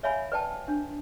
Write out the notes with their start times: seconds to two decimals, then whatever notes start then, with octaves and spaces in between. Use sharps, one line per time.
0.03 C#5 E5 F5 G#5 B5
0.32 B4 D5 G5 A5
0.68 D4